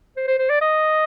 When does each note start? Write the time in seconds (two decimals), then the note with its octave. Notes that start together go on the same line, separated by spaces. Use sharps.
0.17 C5
0.27 C5
0.39 C5
0.50 D5
0.61 D#5